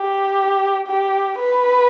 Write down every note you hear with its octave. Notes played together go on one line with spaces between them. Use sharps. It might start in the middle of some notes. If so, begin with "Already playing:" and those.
Already playing: G4
G4
B4